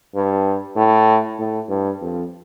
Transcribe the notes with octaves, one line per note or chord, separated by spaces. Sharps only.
G2
A2
A2
G2
F2